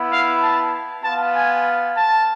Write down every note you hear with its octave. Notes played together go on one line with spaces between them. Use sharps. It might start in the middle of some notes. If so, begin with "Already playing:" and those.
Already playing: B3 E4
F5
A5
B3 F4 A5
G#5
A5